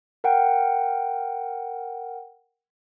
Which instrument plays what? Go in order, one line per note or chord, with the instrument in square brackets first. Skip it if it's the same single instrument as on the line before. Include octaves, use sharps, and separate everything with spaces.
[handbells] A#4 F#5 G5